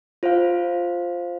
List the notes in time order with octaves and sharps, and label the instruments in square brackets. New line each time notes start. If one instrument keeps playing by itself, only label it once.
[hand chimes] F4 C5 F5